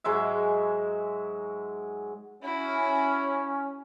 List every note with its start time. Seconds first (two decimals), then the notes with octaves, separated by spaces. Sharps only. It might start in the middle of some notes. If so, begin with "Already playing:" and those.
0.04 G#2 F#3 G#3 E5
2.43 C#4 E4 F#4